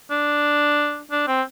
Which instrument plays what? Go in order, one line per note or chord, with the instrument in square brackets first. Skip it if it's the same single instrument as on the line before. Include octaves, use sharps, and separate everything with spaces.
[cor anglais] D4
D4
C4